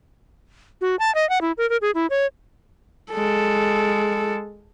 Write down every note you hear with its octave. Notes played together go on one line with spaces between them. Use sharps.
F#4
A5
D#5
F#5
E4
A#4
A#4
G#4
E4
C#5
G#3 A4